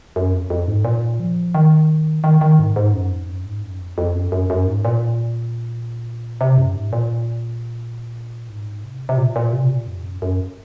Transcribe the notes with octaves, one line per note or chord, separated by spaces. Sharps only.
F#2
F2
F2
G#2
A#2
F3
D#3
D#3
D#3
G#2
G#2
F#2
F2
F#2
G#2
F#2
F2
F2
F#2
F#2
F#2
G#2
A#2
C3
F#2
G#2
A#2
G#2
C3
C3
A#2
A#2
C3
A#2
F2
F#2
F#2